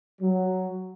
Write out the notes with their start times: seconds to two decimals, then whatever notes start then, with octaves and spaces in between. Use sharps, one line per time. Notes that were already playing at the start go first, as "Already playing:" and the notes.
0.20 F#3